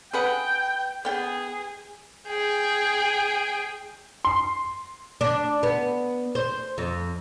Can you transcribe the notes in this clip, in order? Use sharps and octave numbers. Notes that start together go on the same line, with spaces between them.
G#4 B4 F#5 G5
B3 G#4 G5
G#4 G5
C6
D4
B3
C5
F2